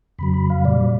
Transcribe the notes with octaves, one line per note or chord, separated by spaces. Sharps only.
F2 C#3 F#3 B5
B5
F5
A#2 G3 D5